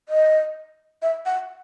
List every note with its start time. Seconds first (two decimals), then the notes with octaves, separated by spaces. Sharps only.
0.09 D#5
1.02 E5
1.26 F#5